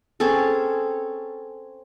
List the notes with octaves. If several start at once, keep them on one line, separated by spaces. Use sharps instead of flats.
C4 C#4 G#4 A4